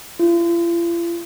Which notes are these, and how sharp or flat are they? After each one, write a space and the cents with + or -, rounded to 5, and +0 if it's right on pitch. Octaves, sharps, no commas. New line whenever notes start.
F4 -45